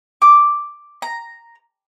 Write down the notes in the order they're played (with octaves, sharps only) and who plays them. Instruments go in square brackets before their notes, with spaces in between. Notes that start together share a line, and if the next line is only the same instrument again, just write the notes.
[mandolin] D6
A#5